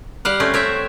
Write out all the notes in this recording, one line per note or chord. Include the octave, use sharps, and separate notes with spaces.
G3 F5 F#5
A3 C4 C#4
C4 C#5 E5